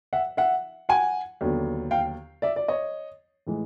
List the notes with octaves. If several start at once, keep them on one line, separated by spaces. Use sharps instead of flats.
E5 F#5
E5 F#5
F#5 G#5
D#2 D3 F#3 B3
F5 G5
D5 E5
D5
C#5 D#5
A2 E3 G#3